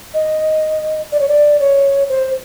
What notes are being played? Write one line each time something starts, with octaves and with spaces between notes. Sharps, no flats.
D#5
D5
C#5
D5
C#5
C5